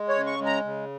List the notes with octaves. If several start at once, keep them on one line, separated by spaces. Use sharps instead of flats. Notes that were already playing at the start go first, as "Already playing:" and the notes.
Already playing: G#3
C#5
C#3
C#6
G#3
A#5
C#3